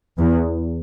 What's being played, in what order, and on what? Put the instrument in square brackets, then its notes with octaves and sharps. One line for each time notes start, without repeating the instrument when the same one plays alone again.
[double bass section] E2